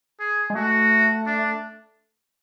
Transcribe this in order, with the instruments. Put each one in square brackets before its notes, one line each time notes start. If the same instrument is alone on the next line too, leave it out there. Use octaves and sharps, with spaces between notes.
[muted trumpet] G#4
[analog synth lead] G#3
[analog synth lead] A3 [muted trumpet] F#4
[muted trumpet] D4